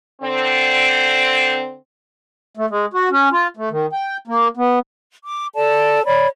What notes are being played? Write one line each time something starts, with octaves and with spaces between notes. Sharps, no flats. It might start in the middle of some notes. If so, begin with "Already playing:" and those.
D3 C4
A3
G#3
F#4
C#4
F4
A3
D#3
G5
A#3
B3
D6
A4 D5 A5
C#5 D5 B5